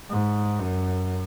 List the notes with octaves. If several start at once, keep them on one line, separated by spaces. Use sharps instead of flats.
G#2
F#2